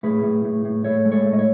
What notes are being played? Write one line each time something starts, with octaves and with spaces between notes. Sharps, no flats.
A2 G#4 B4
A2
A2
A2
A2 A4 C#5
G#3
A4 C#5
A2
D#5
C#5